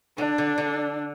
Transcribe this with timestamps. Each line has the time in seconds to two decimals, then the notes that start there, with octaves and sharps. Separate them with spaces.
0.18 D3 D4
0.38 D3
0.58 D3